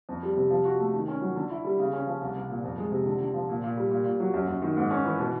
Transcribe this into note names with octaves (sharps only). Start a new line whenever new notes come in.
F2
G3
C3
F3
F#4
A3
D#3
C#4
F#3
D3
E4
G3
C#3
C#4
F3
C2
C2
A#2
F2
G#3
C3
D3
D3
F3
A#2
A#2
G3
A#2
A#2
F#3
F#2
F#2
D#3
G#2
C#4
E3
B2